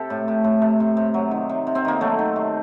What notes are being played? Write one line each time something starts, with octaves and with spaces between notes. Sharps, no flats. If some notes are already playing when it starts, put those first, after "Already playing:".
Already playing: C3 G4 A4
A2
A2
A2
C3
C3
C3
F#3
D#3
C3
C3
C4
D#3 A#3
F#3 A3
D#3
C3